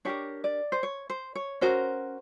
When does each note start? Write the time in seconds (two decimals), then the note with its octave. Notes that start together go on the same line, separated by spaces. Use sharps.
0.05 D4 G4 A#4 C#5
0.44 D5
0.72 C5
0.83 C#5
1.10 C5
1.35 C#5
1.61 C#4 F#4 A#4 C5